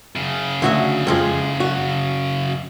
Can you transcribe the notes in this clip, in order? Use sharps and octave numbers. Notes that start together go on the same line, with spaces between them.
F#2 C#3
D2 F#4 E5
F2 F3 G#3
F#4